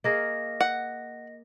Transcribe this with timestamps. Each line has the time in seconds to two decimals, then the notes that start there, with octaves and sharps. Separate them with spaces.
0.04 A#3 G#4 D#5 F5 A#6
0.61 F#5